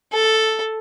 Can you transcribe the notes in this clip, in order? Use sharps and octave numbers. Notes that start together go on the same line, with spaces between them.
A4